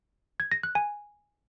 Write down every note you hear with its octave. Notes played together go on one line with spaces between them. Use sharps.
G#6
A#6
F#6
G#5